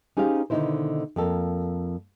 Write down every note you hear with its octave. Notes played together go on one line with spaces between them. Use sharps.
C#4 D#4 G4 G#4 C5 F5
B2 D3 D#3 D#4 E4 C5
F2 A#3 A4 A#4